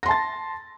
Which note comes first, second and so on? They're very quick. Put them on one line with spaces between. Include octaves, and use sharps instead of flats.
A#6 C6 A5 A6